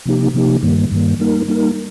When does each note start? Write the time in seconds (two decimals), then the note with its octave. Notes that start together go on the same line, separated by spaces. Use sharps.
0.05 C3 F3 A#3 D#4 G4
0.34 C3 F3 A#3 D#4 G4
0.63 G2 D#3 G3 A#3
0.91 G2 D#3 G3 A#3
1.20 G3 A#3 D#4 A#4
1.48 G3 A#3 D#4 A#4